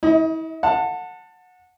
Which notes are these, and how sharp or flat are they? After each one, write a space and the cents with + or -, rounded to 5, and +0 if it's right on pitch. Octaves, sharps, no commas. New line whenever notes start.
E4 -40 D#5 +25
F#5 -20 A5 +20